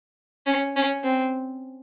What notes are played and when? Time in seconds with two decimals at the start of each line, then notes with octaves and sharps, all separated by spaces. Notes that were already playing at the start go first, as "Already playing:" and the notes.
0.46 C#4
0.76 C#4
1.03 C4